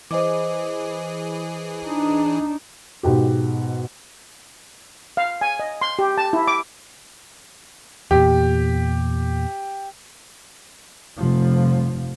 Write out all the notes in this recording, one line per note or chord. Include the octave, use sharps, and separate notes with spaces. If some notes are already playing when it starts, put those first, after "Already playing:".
E3 G#4 C5 D#5 D6
D4 D#4
G#2 B2 G4
F5
G#5
D#5
C6
G4
A5
E4
D6
E2 A#2 G4
F1 G2 F3